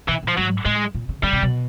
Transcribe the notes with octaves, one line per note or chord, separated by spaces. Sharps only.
B2 E3
A#2
F3
G#2 F#3
A2 G#3
A#2
C#3
D3 G3
C3
B2